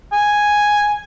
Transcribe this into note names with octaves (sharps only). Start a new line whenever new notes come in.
G#5